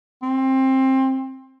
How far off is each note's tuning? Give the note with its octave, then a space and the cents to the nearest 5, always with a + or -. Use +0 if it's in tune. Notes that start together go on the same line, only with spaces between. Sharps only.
C4 +20